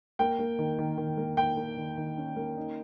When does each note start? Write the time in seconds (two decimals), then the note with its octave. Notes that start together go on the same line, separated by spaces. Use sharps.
0.19 A#3 G5
0.39 A#3
0.59 D#3
0.79 D#3
0.98 D#3
1.17 A#3
1.37 A#3 G5
1.57 A#3
1.77 D#3
1.97 D#3
2.17 C#4
2.36 A#3
2.57 D#4